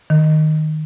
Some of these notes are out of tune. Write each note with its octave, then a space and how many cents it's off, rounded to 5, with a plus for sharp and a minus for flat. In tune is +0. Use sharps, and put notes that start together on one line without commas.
D#3 -5